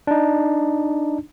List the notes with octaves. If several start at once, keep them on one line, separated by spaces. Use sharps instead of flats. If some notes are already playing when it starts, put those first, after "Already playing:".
D4 D#4